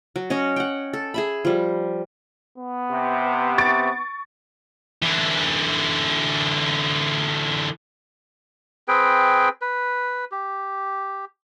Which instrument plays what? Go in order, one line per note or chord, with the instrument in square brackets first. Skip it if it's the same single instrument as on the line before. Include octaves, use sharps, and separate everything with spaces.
[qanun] F#3
C#4 C#5 D#5
F#5 G5
A4
G#4 E5 B5
F3 G3
[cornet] B3
[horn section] C3
[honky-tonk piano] C#6 A6 D7
[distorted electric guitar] D3 E3
[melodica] C4 G#4 B4 G5
B4
G4